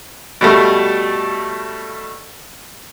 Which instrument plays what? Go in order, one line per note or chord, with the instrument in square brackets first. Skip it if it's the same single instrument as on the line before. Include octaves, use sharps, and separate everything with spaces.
[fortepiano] B2 G3 A3